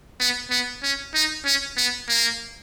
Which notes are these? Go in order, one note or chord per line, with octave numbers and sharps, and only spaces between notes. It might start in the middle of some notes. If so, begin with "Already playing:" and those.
B3
B3
C#4
D#4
C#4
B3
A#3